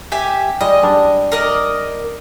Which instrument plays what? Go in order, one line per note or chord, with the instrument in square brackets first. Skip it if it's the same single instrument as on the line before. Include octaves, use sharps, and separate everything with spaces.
[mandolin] G4 E5 G#5
[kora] G3 G#3 [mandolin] D#5
[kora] G3 D4
[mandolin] A#4 D5 D#5